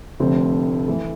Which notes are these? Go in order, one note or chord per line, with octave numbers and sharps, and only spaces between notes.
F1 F2 D3 A3 C4
E3 A3